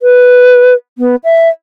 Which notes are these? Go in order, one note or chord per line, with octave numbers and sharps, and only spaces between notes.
B4
B3
E5